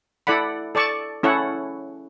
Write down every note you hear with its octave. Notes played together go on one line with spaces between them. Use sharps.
E4 A4 D5 F#5 B5
A4 D5 A5 C#6
C#4 E4 A4 C#5 F#5